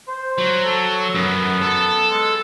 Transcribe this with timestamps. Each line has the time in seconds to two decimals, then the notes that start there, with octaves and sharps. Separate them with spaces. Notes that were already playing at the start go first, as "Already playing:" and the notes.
0.08 C5
0.38 F#3
0.64 A4
1.15 F#2 B3
1.61 A4
2.10 G#3